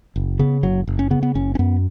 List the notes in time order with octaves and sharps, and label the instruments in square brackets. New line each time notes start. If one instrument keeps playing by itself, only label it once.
[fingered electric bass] F#1
C#3 B3
F#1 F#3
F#1
C#4
C#3 B3
B3
F#1 C#4
C#4
F#2 B3